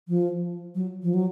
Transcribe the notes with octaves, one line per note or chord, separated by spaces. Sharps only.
F3
F#3
F3
F#3